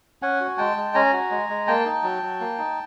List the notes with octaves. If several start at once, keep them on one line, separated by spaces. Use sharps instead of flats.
C#4 F#5 G#5
F#4
G#3 G5 A5
G#3
C#4 G#5 A#5
F#4
G#3
G#3
A#3 G5 A5
D#4
F#3
F#3
A#3
D#4